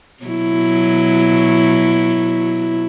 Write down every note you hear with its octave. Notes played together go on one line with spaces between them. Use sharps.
B2 F#3 E4